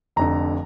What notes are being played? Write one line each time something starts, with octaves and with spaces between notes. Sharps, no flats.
F1 F2 D3 A#5